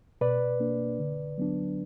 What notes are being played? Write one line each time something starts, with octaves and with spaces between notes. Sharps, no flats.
B2 B4 D5
A#3 D4
D3
F#3 B3 D4